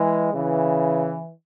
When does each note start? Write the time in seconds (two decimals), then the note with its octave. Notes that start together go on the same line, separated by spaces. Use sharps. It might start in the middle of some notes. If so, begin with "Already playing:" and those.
Already playing: E3 G#3
0.34 C#3 E3